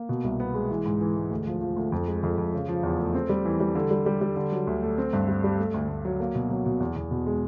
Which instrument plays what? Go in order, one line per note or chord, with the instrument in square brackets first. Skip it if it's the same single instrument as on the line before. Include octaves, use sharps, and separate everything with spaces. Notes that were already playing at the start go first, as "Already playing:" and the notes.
Already playing: [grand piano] A#3
B2
C2
B3
G#3
E3
G#2
E3
G#3
D2
F3
F3
D2
F2
G#3
F2
F2
C#3
F3
E2
A3
C4
G3
E3
G3
D3
G3
G3
G3
D3
F#3
D2
A3
C4
G2
G3
G3
A3
D2
D2
F#3
A#3
B2
F#3
B2
E2
E2
B2
G#3